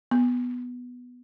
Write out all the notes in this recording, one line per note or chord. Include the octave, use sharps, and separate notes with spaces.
B3